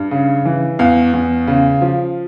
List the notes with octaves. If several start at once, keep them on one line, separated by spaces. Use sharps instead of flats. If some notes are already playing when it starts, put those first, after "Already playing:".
Already playing: G2
C#3
E3
E2 F5
E2
C#3
F3